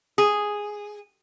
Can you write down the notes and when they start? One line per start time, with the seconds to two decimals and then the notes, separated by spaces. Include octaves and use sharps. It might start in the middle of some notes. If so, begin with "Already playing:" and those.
0.18 G#4